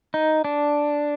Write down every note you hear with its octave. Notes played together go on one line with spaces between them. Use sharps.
D#4
D4